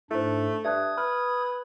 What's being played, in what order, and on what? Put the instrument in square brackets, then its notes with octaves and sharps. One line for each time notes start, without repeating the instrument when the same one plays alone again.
[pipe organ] G#2 D4 [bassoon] A3 [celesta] E4 C5
[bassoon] G2 [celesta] E5 A5 F#6 [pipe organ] D#6 G#6
[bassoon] B4 [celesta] F6